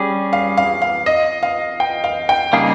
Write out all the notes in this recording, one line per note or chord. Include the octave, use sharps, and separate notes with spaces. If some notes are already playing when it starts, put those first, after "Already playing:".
Already playing: G3 C#4 G#4
F5
F5
F5
D#5
F5
G5
F5
G5
C#3 G3 A#3 D#4 G#4 F5